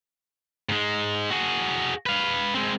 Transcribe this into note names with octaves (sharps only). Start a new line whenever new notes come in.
G#2 G#3
F#4 G#4
B4 F5
G#3 C4